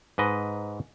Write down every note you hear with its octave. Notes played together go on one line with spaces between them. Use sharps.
G#2 B4 D#5